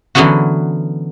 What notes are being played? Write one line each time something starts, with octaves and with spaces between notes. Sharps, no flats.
D3 E3 F#3 B3 C#4 F#4